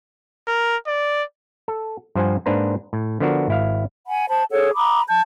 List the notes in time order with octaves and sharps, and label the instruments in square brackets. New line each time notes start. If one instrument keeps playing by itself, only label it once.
[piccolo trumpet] A#4
D5
[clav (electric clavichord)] A4
G2 F3 C5 F#5 G#5
G#2 A#3 D4 B4 C5 A#5
A2
D3 F3 B3 D4 F#4 A#4
G#1 E4 F5
[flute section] F#5 G#5 B5
C5 A5 B5
G#4 A4 C#5 F#5
A#5 B5 D6 D#6
A5 G6